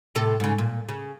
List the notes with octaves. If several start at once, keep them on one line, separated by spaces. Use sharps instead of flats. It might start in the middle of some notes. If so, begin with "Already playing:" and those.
A2 C3 A4
G#2 C#3
A#2
C#3